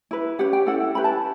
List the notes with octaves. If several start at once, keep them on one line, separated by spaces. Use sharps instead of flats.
E4 B4
C#4 G4 B4 F#5
G5
C#4 E4 A4 F#5
C#4 E4 G4 B4 B5
A5